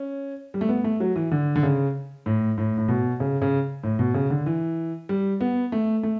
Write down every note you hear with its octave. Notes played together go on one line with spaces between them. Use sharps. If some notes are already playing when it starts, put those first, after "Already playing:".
Already playing: C#4
G3
A3
B3
A3
F#3
E3
D3
D3
C#3
A2
A2
A2
B2
C#3
C#3
A2
B2
C#3
D3
E3
G3
B3
A3
A3